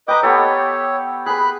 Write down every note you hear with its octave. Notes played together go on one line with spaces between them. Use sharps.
B4 D#5 G5 A#5 D6
B3 G4 A4 C#5
G#4 B4 B5 F#6